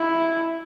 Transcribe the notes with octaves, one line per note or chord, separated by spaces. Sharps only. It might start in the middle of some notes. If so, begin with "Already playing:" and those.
Already playing: E4